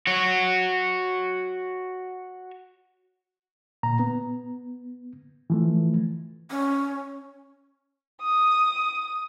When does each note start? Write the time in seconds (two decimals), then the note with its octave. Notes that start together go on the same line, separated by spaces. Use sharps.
0.07 F#4 C#5
3.83 A#2 A#5
3.99 B3
5.50 E3 F3 A3
6.50 C#4
8.22 D#6